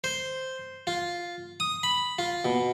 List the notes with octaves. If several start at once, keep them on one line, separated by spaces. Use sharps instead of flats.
C5
F4
D#6
B5
F4
B2